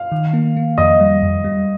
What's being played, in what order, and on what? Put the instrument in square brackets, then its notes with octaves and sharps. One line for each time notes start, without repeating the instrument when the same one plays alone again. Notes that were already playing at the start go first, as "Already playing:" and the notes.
Already playing: [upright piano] F5
[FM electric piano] D#3
A#3
A#3
[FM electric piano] F2 [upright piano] D#5
[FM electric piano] G3
F2
G3